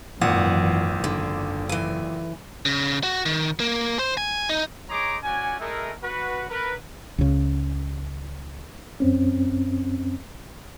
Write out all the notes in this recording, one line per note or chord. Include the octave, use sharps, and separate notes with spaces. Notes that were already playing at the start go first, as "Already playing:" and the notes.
G#1 F#2 A#2 E3 F#5
F#1 D3
E3 G#5
C#3
F#4
D#3
A#3
C5
G#5
D#4
D#4 G#4 C#5 A#5 C6 D6
C#4 F#4 D5 G#5
G#3 A3 E4 G#4 A#4
F#4 B4
A#4 B4
C#2 C#3
F#2 C4 C#4